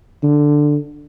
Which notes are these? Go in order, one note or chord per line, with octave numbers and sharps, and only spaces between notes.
D3